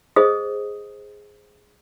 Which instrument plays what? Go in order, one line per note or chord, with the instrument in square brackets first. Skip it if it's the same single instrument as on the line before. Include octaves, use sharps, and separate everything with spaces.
[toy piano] G#4 C5 D#5 D#6